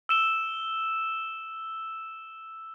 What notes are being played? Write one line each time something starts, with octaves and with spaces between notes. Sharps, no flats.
E6 E7 G7